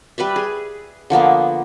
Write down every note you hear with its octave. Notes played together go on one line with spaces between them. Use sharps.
G3 B4 D5 E5
G#4
D3 F3 A#3 B3